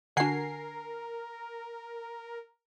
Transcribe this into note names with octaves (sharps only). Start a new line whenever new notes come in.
D3 D4 F#4 A#4 F#5 G#5 C7